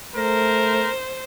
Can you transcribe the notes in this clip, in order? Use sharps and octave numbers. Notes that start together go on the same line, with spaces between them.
A3 A#4 C5